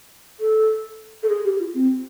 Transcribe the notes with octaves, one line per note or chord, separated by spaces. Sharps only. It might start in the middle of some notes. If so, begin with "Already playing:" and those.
A4
A4
G#4
G4
F4
C4